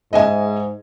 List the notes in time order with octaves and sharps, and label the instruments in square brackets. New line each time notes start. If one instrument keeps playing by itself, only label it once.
[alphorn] G#2 [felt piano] D#5 E5 G#5